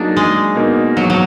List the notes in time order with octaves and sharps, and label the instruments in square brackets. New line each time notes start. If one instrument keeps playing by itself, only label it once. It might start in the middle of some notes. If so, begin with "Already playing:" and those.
Already playing: [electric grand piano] F#3 A#3 D#4 G#4 [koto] D4
[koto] G#3
[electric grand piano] B2 A#3 D#4 A#4
[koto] F#3
F#3